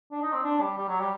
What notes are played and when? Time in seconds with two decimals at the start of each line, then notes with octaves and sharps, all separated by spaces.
0.11 D4
0.22 D#4
0.33 C4
0.44 D4
0.60 G3
0.78 G3
0.88 F#3
1.00 G3